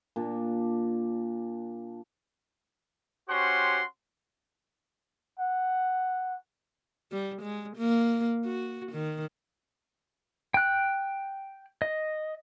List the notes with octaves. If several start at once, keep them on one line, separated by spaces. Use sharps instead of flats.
A#2 D4
C#4 F#4 G4 C5 F#5 C6
F#5
G3
G#3
A#3
F#4
D#3
G5 F#6
D#5